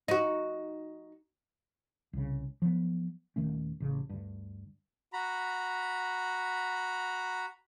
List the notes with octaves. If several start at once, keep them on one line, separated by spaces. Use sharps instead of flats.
D#4 F#4
C2 C#3
F3 F#3 A#3 B3
D#1 D#3 A3 C#4
A1 C#3
D2 G2
F#4 A#5 B5